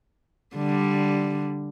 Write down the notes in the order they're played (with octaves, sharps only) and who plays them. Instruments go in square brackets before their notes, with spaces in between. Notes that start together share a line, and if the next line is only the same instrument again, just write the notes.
[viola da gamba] D3 G3